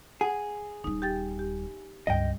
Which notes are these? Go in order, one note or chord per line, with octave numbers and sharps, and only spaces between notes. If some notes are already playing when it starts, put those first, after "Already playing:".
G#4 F#5
D#1 G3 D#4
G4 G5 A6
G4
C#2 G2 G3 D#5 G5